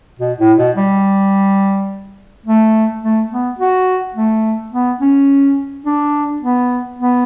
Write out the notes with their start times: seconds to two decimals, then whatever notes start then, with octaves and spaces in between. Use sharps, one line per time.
0.19 B2
0.39 A2
0.58 B2
0.76 G3
2.46 A3
3.03 A3
3.31 B3
3.59 F#4
4.15 A3
4.72 B3
5.01 C#4
5.86 D4
6.42 B3
6.99 B3